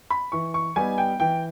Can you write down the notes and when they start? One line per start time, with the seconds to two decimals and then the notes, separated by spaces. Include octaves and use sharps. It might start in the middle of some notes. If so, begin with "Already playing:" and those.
0.10 B5
0.32 E3 C#6
0.54 C#6
0.76 G3 B3 D#4 G#5
0.98 G5
1.20 E3 G5